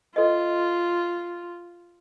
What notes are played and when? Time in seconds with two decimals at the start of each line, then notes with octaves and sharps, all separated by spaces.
0.16 F4 A4 D#5